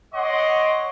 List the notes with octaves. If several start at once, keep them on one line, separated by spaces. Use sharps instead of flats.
C#5 D#5 F#5 C6 D6